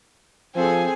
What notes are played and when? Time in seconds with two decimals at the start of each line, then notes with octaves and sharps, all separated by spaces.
0.56 F3 C4 G#4 A4 G#5